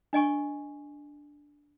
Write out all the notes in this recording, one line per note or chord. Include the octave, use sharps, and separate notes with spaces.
D4 D#5 G#5 C#6